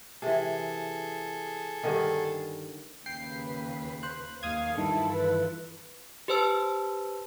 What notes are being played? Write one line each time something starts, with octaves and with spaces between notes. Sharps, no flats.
C3 E3 G#4 A4
G2 D3 D#3
D#2 C#3 B4 G5 C7
C5 F#6
D#2 F5 D#6 G#6
G2 D#3 E3 E4 F4 A4 A5
B4
G4 B4 C5 A5 E6